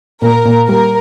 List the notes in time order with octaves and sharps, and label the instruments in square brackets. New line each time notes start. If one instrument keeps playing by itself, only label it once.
[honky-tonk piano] A#2 [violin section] A#4
[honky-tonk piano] A#2
[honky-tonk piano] G3 [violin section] A#4